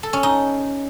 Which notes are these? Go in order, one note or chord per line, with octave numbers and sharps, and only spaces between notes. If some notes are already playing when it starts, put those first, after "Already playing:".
A4
C#4
D#4